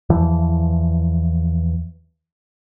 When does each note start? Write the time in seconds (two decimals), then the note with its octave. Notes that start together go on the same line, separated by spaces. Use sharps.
0.09 E2 E3 F3